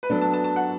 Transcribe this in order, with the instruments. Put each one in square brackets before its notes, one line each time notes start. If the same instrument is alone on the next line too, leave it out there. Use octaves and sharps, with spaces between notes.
[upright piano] B4
[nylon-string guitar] F#3 B3 D4 [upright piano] A4
[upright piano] A5
A5
A5
F#5